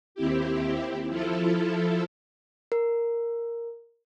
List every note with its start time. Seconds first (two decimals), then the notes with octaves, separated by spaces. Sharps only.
0.15 D#2 C4 E4 G4
1.09 F3 E4 F4 A4
2.72 A#4